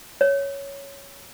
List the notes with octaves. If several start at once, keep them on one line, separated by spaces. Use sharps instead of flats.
C#5